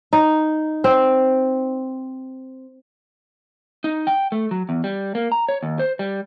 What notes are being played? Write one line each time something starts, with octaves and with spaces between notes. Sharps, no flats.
D#4
C4
D#4
G5
A3
F#3
E2
G3
A#3
A#5
C#5
D#2
C5
G3